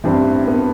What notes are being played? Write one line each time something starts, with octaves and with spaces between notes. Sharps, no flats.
A1 G2 E3 C4
B3